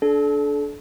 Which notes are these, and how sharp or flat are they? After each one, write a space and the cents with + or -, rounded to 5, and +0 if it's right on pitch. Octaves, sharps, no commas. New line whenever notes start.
D4 -10 A4 -35